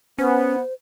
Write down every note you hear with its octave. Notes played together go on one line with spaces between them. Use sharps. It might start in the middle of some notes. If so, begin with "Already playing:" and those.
B3 C#4 C5